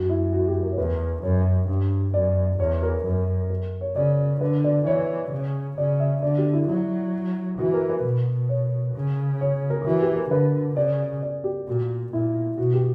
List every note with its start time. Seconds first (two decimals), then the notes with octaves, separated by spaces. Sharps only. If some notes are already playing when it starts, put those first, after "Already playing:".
Already playing: F#2 F#4
0.09 E4
0.33 F#4
0.48 G4
0.63 A#4
0.72 C#5
0.78 E2 B4
1.23 F#2 C#5
1.68 G2
2.14 F#2 D5
2.59 E2 C#5
2.83 A#4
3.04 F#2
3.50 A#4
3.81 C#5
3.96 C#3 D5
4.41 D3 B4
4.64 D5
4.86 E3 C#5
5.32 C#3
5.77 C#3 D5
6.00 E5
6.22 D3 D5
6.38 G4
6.53 E4
6.68 F#3 E4
7.59 E3 F#4
7.74 A#4
7.89 B4
8.04 B2
8.49 C#5
8.95 C#3
9.41 C#5
9.70 A#4
9.85 E3 F#4
10.01 G4
10.16 A#4
10.31 D3 B4
10.76 C#3 D5
11.22 D5
11.44 G4
11.67 A#2 F#4
12.13 A#2 E4
12.57 B2 F#4
12.74 G4